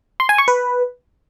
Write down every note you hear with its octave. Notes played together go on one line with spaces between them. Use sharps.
C6
G#5
C#6
B4